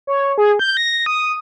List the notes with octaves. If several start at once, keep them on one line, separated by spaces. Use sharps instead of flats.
C#5
G#4
G6
A#6
D#6